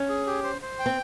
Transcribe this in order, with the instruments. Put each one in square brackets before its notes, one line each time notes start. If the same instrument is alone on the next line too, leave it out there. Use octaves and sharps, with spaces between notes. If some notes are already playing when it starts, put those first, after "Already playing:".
Already playing: [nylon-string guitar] C#4
[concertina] G#4
G4
C5
C5
G5
[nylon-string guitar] C4